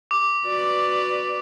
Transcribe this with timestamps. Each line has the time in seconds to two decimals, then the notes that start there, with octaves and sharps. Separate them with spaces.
0.11 D6
0.47 F#4 B4 D5